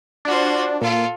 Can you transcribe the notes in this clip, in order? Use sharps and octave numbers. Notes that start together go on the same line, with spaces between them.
D4 F4 F#4 C5
A#2 F4 A4